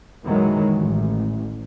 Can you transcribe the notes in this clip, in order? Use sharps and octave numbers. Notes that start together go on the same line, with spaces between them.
F#2 A#2 D#3 E3 F#3 G#3
A1